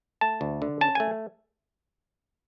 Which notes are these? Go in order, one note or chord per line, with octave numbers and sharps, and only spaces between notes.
A3 A5
D2
D3
C#4 A5
A3 G#5